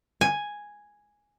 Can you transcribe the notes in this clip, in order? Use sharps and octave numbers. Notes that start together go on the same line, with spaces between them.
G#5